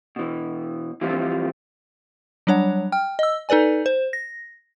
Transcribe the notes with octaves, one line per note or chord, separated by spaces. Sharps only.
B2 E3
E3 F3 G3 C4 F4
F#3 G3 D4 C#5 F#5
G5 F6
D#5 E6
D#4 A4 B4 D5 G#5
C5
A#6